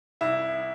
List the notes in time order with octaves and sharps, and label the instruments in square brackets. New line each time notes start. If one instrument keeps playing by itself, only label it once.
[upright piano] C2 E4